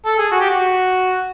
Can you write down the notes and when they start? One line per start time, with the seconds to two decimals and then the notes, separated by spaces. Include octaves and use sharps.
0.06 A4
0.18 G#4
0.31 F#4
0.40 G4
0.51 F#4